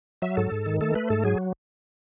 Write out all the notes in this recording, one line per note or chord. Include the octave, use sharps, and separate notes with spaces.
F#3 E5
G#2 A4
G#2
D#3
A3 A4
A3 B4
G#2 A4
F#3 G#4